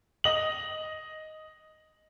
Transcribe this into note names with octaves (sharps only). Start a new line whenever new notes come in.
D#5 F#7